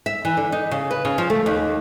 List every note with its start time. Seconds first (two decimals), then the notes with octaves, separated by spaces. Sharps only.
0.06 E5
0.25 E3
0.37 D3
0.52 D#4
0.71 C#3
0.91 B4
1.05 C#3
1.18 F3
1.30 A3
1.46 D#2